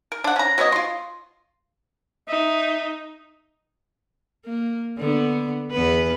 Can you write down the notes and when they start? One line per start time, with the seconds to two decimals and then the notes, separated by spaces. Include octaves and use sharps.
0.12 A#4
0.24 D4 F#5
0.36 C#4 A#5
0.58 F#3 B3 C#5 D#5
0.72 F4 C6
2.29 D#4 E5
4.45 A#3
4.98 D3 B3
5.71 E2 B3 B4